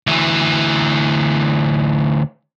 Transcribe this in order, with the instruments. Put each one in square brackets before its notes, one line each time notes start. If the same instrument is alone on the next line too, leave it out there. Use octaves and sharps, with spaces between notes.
[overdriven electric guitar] D2 E3